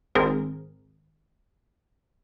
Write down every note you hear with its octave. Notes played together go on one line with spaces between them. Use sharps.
G#1 C4 G#4 A#4